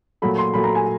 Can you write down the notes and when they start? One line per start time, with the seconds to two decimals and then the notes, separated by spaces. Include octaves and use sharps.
0.22 A#2 F#3 A3 B5
0.38 C6
0.54 A#2 F#3 A3 B5
0.64 A#5
0.75 G#5